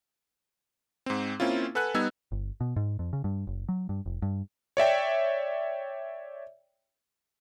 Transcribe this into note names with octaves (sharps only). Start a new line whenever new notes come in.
G#2 C4
A#3 C4 C#4 E4 F4
A4 B4 F#5 G#5 F#6
G3 B3 D#4 E6 G#6
G1
B2
G#2
F2
C#3
G2
F#1
F#3
G2
F1
G2
C#5 D5 E5 G5